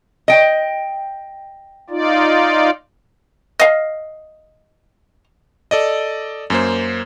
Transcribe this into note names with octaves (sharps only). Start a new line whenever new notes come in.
D#5 G5
D#4 F4 D5
D#5 F5
A4 D5 D#5
F#2 A#3 C5